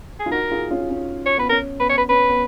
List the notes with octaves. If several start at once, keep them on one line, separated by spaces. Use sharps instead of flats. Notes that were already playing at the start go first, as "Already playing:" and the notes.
G#4
F4
D#4 F#4 A#4
F4 G#4
C#4 F4
C#4
C#5
B3 B4
C#4 A#4
B3 B4
C#5
B4
C#4 B4
B3